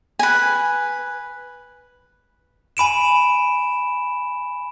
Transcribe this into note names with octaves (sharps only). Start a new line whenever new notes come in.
B4 G#5
G#5 B5 D7 E7